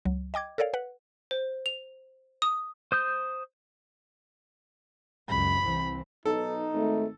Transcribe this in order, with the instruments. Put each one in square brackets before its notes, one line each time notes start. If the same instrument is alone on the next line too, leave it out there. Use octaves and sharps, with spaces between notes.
[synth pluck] C#2 F#3
D#5 G5 D6 G#6
A4 A#4 C#5 D5 F5
B4 F#5
[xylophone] C5
F7
D#6
[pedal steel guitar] C5 D#6 G6
[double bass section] C#2 F#2 [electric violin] B5
[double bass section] C2 E3 C4
[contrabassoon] B1 [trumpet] D#4 [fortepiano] A4
[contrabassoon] G#1 [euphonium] A3